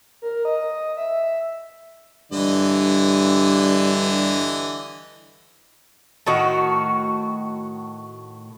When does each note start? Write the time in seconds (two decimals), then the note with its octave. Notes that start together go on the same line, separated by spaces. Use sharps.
0.22 A#4
0.45 D#5
0.97 E5
2.32 G2 D3 E3 D#5
6.27 A2 D#3 F#4